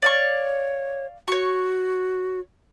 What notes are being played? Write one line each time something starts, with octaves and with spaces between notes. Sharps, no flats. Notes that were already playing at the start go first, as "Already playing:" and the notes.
C#5 D5 F5 C#6
F#4 C#5 C#6